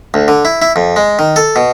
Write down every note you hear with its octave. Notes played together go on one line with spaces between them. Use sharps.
D2
D3
E4
E4
F2
G#3
D#3
A4
B2